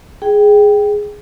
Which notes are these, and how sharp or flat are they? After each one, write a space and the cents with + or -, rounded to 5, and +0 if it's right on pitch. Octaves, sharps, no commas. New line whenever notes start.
G#4 +0 G5 +0